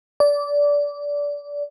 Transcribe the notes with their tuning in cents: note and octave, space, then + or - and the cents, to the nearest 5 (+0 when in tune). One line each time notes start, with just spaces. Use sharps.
D5 -20